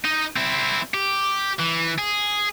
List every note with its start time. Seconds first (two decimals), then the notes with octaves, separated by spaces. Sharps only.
0.05 D#4 D#5
0.36 C4 E4
0.94 G4
1.59 E3
1.98 G#4